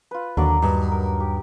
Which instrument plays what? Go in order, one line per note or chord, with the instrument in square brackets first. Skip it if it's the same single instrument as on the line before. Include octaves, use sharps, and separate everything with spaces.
[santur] F4 B4
[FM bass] D#2 [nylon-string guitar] D3 [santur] F#3 A#3 D5
[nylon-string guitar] G2 [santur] D#4 B4
[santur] A#4
G4